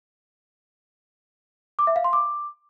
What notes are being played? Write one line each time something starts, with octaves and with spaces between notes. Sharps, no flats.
D6
E5
F5
C6
D6